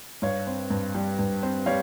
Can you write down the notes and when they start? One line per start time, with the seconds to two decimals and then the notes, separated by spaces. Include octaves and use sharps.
0.22 G2 C#5 F5
0.47 C4
0.70 G2
0.94 G3
1.19 G2
1.43 C4
1.66 G3 C#5 F5